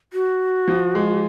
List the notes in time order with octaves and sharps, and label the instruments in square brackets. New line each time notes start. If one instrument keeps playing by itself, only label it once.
[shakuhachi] F#4
[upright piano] F3
G#3